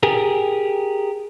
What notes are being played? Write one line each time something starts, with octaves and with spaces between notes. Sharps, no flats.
G4 G#4 A#4